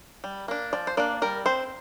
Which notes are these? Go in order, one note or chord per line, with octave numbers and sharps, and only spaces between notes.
G3
A#3 D4
F3 D5
C5
A#3 D4 D5
G3 A#4
C4 C5